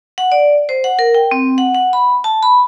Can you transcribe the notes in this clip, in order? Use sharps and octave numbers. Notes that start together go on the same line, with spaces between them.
F#5
D5
C5
F#5
A#4
G5
C4
F#5
F#5
B5
A5
B5